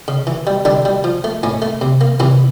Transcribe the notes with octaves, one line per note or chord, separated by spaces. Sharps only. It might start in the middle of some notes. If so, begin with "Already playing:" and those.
C#3
E3
G3
D3 G3 D4
G3
F3
A3
A2 C#4
A3
C3
A#3
C3 E3 E4